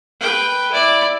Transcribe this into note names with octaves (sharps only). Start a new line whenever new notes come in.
B4 G5
E4 D5